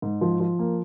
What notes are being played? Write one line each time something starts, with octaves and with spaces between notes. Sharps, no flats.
G#2
F3
F3
A#3